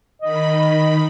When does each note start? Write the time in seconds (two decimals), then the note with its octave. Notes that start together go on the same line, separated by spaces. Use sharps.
0.22 D#3 D#5 B5